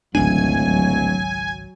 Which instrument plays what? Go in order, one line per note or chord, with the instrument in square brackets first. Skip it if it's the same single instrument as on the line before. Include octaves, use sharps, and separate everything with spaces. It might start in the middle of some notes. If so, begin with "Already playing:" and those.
[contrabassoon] D1 [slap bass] G#1 C#2 D4 [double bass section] F#3 [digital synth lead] G#5